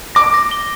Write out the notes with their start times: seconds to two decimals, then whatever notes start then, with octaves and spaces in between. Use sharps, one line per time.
0.15 D6 A#6
0.34 A#6
0.51 G7